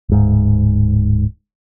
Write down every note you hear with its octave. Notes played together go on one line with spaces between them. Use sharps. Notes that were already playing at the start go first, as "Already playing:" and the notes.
D1 G#2